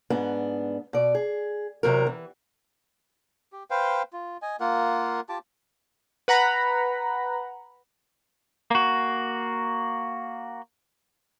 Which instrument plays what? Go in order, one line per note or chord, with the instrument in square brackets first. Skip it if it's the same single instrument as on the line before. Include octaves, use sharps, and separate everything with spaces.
[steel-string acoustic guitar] G#2 B3 D4
B2 D5
G#4
E2 C3 F#3 A#4
E3
[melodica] G4
B4 C5 F5 G5
F4
D#5 G#5
A#3 F4 A#4 F#5
F4 G4 A5 D6
[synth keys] B4 F#5 A#5 B5
[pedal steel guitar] A#3 F#4